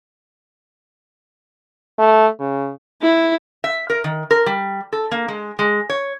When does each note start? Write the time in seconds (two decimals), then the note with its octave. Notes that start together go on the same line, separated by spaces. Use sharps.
1.98 A3
2.39 C#3
3.02 E4
3.64 E5
3.90 A#4
4.04 D#3
4.31 A#4
4.46 G3
4.93 A4
5.11 A#3
5.28 G#3
5.59 G#3
5.89 C#5